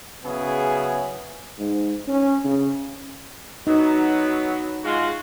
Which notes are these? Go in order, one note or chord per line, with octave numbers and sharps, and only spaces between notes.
C#3 F#3 B3 C#4 E4 G#4
G#2
C#4
C#3
F#3 B3 D#4
G#3 F4 F#4